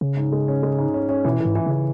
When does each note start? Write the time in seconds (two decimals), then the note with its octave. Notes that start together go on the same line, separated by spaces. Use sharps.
0.01 C#3 C#4
0.17 G#2
0.32 G#3
0.48 C#4
0.63 G#3
0.79 G#2
0.94 C#4
1.09 C#4
1.24 B2 E3
1.40 G#2 E3
1.55 E3
1.66 C#3 E3